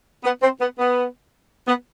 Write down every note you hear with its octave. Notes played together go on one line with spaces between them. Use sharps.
B3
C4
B3
B3
B3